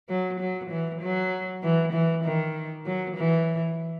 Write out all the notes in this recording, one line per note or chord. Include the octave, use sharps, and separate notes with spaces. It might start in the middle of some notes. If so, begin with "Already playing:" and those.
F#3
F#3
E3
F#3
E3
E3
D#3
F#3
E3